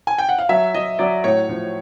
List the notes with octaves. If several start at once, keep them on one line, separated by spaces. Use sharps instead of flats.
G#5
G5
F#5
F5
F#3 E5
F#3 D#5
F#3 D5
A2 C#5
F3